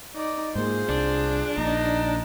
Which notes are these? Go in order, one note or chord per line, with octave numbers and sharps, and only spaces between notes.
D#4 D5
G#2 A#3 F4 G#4 C5
C2 D4
A#1 A#2 D#4 A#5